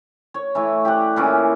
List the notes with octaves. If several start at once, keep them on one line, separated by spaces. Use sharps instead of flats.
C#5
E3 A3
G4 D5 F#5
A#2 E3 C#4 D6